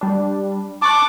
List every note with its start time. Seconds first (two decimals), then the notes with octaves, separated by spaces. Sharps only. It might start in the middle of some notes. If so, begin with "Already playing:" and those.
0.01 G3 D4
0.82 A5 C#6 D6 F#6